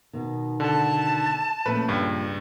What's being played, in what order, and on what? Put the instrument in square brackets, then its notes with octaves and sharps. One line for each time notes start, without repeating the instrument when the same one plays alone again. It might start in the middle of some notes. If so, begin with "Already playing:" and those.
[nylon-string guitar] B2 D#3
[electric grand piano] D3 A4 [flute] A5
[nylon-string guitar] A#2 F3 C#4 [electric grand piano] A3 B4
[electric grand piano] C#2 G2